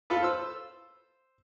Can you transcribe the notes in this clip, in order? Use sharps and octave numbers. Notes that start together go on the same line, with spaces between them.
F4 A4 B4
C5 E6